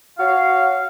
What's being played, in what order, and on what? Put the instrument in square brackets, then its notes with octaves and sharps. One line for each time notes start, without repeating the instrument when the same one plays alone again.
[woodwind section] F#4 C#5 F5